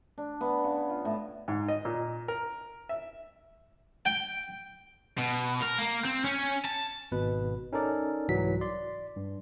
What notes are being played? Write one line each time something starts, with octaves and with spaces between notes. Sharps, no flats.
D4
B3
C#3
F4
A2
G#2
D#5
A#2
A#4
E5
G5
B2
A#4
A#3
C4
C#4
A5
G#1 B2 B4
C#4 D#4 A4 A#4 D5
C2 G#2 E3 F#3 B6
D5 C6
G2